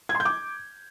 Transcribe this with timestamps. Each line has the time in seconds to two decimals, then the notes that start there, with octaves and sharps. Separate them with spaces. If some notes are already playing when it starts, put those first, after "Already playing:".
0.09 G#6
0.15 C6
0.20 G6
0.25 D6